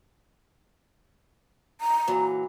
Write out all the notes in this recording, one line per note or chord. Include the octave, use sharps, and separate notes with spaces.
A#5
A#2 E3 F#3